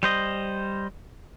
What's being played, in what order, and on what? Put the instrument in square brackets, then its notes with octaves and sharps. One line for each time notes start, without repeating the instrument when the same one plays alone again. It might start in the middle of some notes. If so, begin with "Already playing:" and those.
[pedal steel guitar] G3 C5 D#5